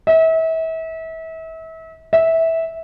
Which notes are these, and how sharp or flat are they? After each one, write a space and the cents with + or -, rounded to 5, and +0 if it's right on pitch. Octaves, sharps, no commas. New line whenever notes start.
E5 -35
E5 -15